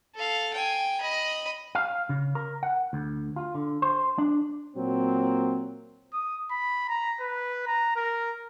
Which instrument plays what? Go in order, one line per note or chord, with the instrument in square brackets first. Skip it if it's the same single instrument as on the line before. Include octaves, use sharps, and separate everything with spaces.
[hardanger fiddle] A4 F5
G5 G#5
D#5 B5
[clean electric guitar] F5
C#3
A#4
F#5
D2
F4
D3
C5
D4
[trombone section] A#2 F#3 A#3 C4
[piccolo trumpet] D#6
B5
A#5
B4
A#5
A#4